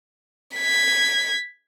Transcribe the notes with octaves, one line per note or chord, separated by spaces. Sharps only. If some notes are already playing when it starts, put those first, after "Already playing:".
G#6 B6